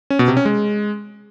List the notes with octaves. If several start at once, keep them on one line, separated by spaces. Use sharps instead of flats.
C#4
B2
C3
C#4
G#3